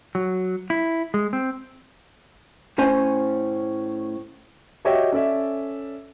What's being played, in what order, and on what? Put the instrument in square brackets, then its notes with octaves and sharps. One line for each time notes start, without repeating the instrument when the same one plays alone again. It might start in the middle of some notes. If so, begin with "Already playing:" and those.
[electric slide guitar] F#3
E4
G#3
C4
[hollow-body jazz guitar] A2 C#4 C5 G#5
[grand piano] F#4 G4 C#5 D#5 E5 G5
C#4 A4 D5 E5